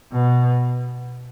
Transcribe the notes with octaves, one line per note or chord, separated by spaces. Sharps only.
B2